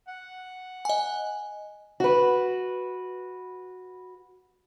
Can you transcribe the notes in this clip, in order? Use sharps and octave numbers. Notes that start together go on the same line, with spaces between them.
F#5
D#5 G#5
F#4 B4